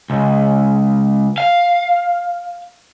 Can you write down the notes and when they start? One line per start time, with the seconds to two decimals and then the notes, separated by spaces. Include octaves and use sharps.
0.10 C#2
1.38 F5